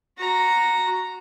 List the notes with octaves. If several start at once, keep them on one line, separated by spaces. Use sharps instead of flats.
F#4 A#5